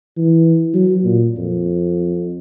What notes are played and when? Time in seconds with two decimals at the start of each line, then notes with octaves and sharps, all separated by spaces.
0.17 E3
0.74 F#3
1.05 A#2
1.37 F2